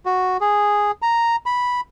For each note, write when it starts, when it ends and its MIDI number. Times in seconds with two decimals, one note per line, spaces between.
0.06 0.37 66
0.41 0.91 68
1.02 1.36 82
1.46 1.81 83